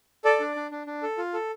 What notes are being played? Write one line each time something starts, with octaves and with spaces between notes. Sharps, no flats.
A4 D5
D4
D4
D4
D4
A4
F4
A4